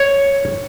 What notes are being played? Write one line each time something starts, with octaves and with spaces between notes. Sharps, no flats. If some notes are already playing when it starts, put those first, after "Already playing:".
Already playing: C#5